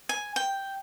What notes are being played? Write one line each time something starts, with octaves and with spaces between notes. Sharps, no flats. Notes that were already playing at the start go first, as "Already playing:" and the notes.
G#5
G5